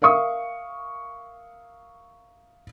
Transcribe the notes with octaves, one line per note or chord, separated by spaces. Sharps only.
A#4 E5 F5 C#6 D#6